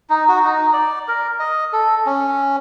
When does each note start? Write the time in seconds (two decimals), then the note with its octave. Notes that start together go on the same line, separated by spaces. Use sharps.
0.10 D#4
0.28 F#4
0.45 D#4
0.73 D5
1.08 A#4
1.40 D#5
1.73 A4
2.06 C#4